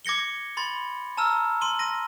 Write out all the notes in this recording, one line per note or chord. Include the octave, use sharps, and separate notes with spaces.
D6 G#6 A#6 C#7 G7
B5 C6 A6
A5 A#5 E6 F6
C6 D#7 G7
A#6 D#7